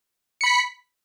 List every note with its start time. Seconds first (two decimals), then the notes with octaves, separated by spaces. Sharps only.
0.41 C#7
0.44 B5
0.46 B6